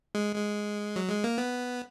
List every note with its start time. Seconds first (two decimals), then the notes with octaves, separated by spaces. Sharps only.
0.15 G#3
0.36 G#3
0.96 F#3
1.10 G#3
1.24 A#3
1.38 B3